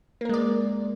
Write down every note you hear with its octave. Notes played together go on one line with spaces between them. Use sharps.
G#3 A#3 A#4 D5